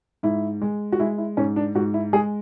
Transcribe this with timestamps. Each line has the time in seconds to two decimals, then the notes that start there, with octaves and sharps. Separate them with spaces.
0.23 G#2 E4
0.61 G#3
0.92 F#4
1.00 G#3 E4
1.18 E4
1.37 G#2 C#4
1.56 D4
1.75 G#2 F#4
1.94 E4
2.13 G#3 G#4